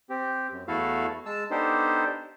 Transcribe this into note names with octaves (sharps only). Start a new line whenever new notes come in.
C4 G4
F#2
E2 A3 E4 F#4 A4 F5
G#3 A5 E6
B3 D4 D#4 G4 A4 C5